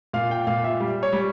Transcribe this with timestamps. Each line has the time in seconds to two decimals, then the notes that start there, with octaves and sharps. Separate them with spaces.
0.13 A#2 F5
0.31 G5
0.47 A#2 F5
0.64 E5
0.80 G3
1.03 C#5
1.12 G3